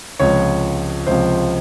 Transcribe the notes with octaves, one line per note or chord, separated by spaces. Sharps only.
C#2 C3 F3 C#5
C#2 C3 F3 C5